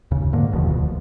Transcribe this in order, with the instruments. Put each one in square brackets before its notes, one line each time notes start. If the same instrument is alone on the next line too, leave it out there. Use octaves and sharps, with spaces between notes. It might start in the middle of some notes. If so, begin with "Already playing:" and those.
[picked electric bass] D#2 C#3
G#2 D3 A#3
E1 D#2 B2 F3
D2